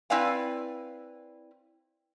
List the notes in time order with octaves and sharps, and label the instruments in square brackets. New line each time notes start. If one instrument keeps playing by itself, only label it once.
[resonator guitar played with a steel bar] C4 E4 B4 D5 F5 G#5